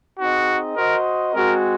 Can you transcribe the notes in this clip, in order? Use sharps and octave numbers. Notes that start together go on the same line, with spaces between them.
C4 D#4 F#4 G#4 D#5
F#4 A#4 C5 D#5
G#3 C4 F#4 A#4